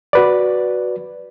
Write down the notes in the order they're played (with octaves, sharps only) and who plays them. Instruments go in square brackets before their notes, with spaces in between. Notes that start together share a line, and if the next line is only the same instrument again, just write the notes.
[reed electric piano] F#4 B4 D5